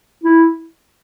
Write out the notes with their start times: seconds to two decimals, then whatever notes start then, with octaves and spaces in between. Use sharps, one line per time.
0.24 E4